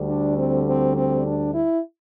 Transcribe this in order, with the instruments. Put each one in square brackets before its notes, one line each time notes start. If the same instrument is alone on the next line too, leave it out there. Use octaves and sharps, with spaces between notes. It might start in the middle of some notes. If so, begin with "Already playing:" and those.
Already playing: [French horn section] D2 D3 G3
D4
C4
C4
C4
D4
E4